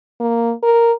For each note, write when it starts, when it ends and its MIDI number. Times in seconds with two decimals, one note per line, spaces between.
0.20 0.53 58
0.63 0.92 70